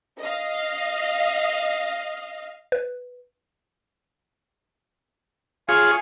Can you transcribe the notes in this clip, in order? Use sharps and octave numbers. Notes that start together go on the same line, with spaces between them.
D#5 F5
B4
F4 G#4 C#5 F5 G#5 C#6